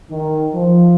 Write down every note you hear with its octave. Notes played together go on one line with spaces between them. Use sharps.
D#3
F3